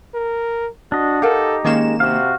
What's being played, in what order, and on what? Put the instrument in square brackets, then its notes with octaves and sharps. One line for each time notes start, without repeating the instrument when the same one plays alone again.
[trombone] A#4
[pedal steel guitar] D4 D#5 [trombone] F#4
[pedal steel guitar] D#4 G4 [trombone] A4 [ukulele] A#4 F5 F#5
[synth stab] D#3 A#3 E7 [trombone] G#3 [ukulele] C#4 C#5
[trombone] C3 [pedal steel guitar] F#4 F5